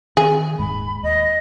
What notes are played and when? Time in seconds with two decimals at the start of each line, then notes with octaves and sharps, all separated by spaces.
0.17 D#3 C4 G#4
0.59 D#1 G#2 G#3 B5
1.03 D#2 D#5